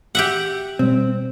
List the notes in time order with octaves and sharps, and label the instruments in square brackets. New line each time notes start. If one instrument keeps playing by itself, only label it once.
[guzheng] G4 E5 F#5
[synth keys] B2 G3 [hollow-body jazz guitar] C4